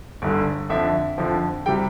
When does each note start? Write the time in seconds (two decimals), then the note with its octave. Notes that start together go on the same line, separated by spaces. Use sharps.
0.22 G1 G2 D3
0.69 F2 D3 F3 E5
1.18 F2 D3 F3
1.66 C3 G3 G5